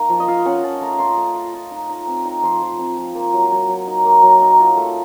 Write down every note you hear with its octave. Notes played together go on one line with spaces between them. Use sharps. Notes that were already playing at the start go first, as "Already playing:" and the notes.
Already playing: A#3 D#4
F3
D#5
F4 F5
C#4 F#5
F4 A5
A3 A#5
F4 C6
A3
F4
F4
D#4
D#4
C4
D#4
F3 C6
F3
C4
F3
A#3
F#3
F#3
F#3
D#4
A#3
F#3
D#4
F4
A3